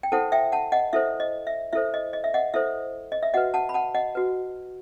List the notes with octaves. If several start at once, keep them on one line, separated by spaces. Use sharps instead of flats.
G5
E4 A4 C5 F#5 A5
E5 G5
F#5 A5
D#5 F#5
E4 A4 C5 E5
D#5
E5
E4 A4 C5 E5
D#5
D#5
E5
D#5 F#5
E4 A4 C5 E5
D#5
E5
F#4 B4 D#5 F#5
F#5 A5
B5
F#5 A5
D#5 F#5
F#4 B4